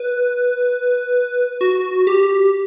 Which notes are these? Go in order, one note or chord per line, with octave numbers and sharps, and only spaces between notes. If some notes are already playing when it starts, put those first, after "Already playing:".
Already playing: B4
F#4
G4